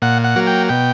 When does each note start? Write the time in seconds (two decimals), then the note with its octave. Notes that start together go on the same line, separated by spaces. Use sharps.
0.02 A#2 F#5
0.24 F#5
0.36 F#3 A#3
0.47 G5
0.69 B2 G5